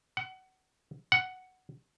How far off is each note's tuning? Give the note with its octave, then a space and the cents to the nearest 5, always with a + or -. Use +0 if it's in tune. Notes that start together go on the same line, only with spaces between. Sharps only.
F#5 +25
F#5 +5